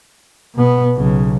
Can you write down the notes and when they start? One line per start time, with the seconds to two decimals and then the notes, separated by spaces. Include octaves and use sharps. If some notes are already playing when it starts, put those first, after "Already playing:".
0.55 B2 B3
0.96 B1 C#3